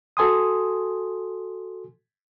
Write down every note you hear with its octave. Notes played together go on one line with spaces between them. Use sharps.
F#4 A4 G#5 C6 D#6